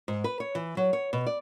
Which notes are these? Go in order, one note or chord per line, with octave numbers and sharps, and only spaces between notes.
G#2
B4
C#5
E3
F#3
C#5
B2
D5